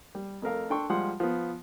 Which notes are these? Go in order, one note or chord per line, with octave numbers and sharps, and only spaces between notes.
G3
F2 A3 A#4 F5
D4 A4 G5 C6 C#6
F3 G3 G#3 F#5 C6
F3 B3